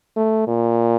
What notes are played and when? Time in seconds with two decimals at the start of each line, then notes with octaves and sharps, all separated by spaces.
0.17 A3
0.47 A#2